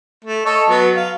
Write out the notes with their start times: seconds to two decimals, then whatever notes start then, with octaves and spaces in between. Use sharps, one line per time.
0.25 A3
0.46 A4 C#5 D#5
0.69 F#3 B3
0.96 F5